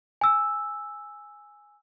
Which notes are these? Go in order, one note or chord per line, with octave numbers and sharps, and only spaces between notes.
G#5 E6